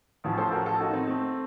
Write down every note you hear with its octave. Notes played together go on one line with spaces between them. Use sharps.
A1 A2 F3
A4 C5
F#4 A#4
F4 A4
D#4 F#4
C4 D#4
A3 C4